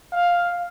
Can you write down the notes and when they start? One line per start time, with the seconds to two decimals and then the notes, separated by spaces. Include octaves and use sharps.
0.12 F5